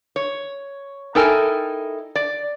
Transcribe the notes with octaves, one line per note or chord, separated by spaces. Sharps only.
C#5
D#4 E4 A4 A#4 G5 G#5
D5